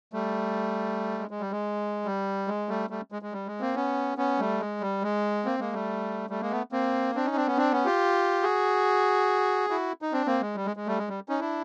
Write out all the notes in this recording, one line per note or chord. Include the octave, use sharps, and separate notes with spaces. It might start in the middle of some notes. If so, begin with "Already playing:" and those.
G3 A3
G#3
G#3
G3
G#3
G3
G#3
G3 A3
G3 A3
G#3
G#3
G3
G#3
A#3 C4
B3 C#4
B3 C#4
G3 A3
G#3
G3
G#3
A#3 C4
G#3 A#3
G3 A3
G3 A3
G#3 A#3
A3 B3
A#3 C4
C4 D4
C#4 D#4
C4 D4
B3 C#4
C4 D4
B3 C#4
F4 G4
F#4 G#4
E4 F#4
D#4
C4 D4
A#3 C4
G#3
G3
G#3
G#3
G3 A3
G#3
G3
C#4 D#4
D4 E4